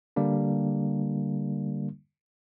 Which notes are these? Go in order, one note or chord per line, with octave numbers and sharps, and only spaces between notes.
D3 G3 A#3 D4